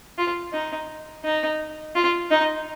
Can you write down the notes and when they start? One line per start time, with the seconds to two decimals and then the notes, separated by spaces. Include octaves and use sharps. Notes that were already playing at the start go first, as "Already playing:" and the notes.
0.18 F4
0.53 D#4
1.24 D#4
1.95 F4
2.31 D#4